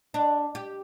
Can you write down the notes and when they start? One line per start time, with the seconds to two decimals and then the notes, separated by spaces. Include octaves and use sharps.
0.14 D4
0.55 G4